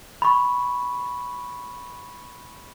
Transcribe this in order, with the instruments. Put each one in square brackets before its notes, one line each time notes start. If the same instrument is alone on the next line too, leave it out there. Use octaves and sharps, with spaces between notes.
[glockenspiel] B5 C#6